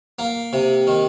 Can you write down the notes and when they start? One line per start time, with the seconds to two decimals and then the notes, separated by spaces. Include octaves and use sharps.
0.19 A#3
0.53 C3
0.87 D#3